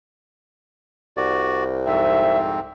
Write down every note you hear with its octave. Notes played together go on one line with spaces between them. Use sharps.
C2 F#4 D5
F2 G#2 C4 E5